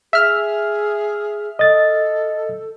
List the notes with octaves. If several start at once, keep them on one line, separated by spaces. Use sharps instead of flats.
G#4 E5 F6
A4 D#5 A6